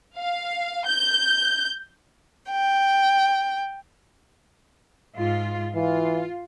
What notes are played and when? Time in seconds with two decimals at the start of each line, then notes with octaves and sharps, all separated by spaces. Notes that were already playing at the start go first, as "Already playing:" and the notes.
0.18 F5
0.86 G6
2.50 G5
5.15 G#2 F4
5.75 E3 F4